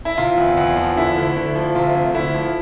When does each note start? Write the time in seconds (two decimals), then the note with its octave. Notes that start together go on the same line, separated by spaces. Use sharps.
0.05 E4
0.18 C3 F4
0.38 E2
0.57 E2
0.77 F3
0.96 D3 E4
1.16 D2
1.36 D2
1.56 F3
1.75 C3 F4
1.95 D2
2.14 D2 E4
2.34 F3